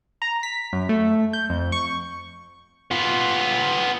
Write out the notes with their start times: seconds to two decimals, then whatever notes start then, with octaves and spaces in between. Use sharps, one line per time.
0.22 A#5
0.43 B6
0.73 F#2
0.89 A3
1.33 G6
1.49 F2
1.72 C#6
2.91 B3 F4